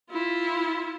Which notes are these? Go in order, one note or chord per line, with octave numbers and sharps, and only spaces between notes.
E4 F4